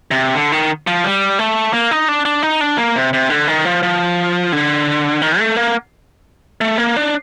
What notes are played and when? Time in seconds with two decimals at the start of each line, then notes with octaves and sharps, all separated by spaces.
0.11 C3
0.34 D3
0.52 D#3
0.87 F3
1.04 G3
1.39 A3
1.73 A#3
1.91 D#4
2.08 D4
2.25 D4
2.43 D#4
2.61 D4
2.78 A#3
2.95 C3
3.13 C3
3.30 D3
3.47 D#3
3.65 F3
3.83 F3
4.52 D3
5.22 D#3
5.39 A3
5.56 A#3
6.61 A3
6.78 A#3
6.96 D4